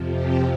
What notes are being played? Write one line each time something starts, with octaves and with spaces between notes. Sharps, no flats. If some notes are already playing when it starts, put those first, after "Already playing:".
Already playing: F2 C3 F3
G4